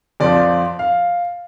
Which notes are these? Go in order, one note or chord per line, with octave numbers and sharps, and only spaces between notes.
F2 F3 C4 F4 D5
F5